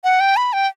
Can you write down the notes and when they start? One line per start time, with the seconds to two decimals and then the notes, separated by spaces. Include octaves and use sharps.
0.04 F#5
0.20 G5
0.37 B5
0.53 G5